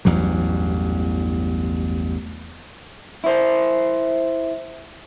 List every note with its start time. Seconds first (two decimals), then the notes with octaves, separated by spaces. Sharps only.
0.05 A1 E2 G2 F#3
3.24 E4 C5